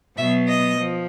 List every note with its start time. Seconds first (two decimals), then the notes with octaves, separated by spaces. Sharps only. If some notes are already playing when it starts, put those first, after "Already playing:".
0.17 B2 F#3 B3 E5
0.47 D#5
0.77 F3